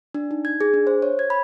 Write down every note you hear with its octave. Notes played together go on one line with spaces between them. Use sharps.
D4
D#4
G#6
G#4
D4
C5
C#5
G#6
B5